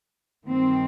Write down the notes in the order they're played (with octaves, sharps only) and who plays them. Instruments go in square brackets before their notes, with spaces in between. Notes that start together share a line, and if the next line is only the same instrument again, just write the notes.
[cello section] G2 D#3 C4